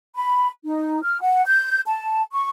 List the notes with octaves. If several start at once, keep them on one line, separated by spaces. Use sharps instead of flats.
B5
D#4
F6
F#5
G6
A5
C#6